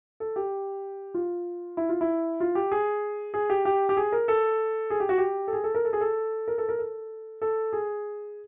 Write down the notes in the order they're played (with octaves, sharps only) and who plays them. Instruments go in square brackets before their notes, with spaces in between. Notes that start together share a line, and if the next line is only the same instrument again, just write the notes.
[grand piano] A4
G4
F4
E4
F4
E4
F4
G4
G#4
G#4
G4
G4
G4
G#4
A#4
A4
G#4
G4
F#4
G4
A4
G#4
A4
A#4
A4
G#4
A4
A#4
A4
A#4
A4
A4
G#4